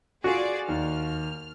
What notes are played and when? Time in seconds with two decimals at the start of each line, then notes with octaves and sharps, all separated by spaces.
0.24 F4 F#4 G#4 D5
0.68 D#2 F6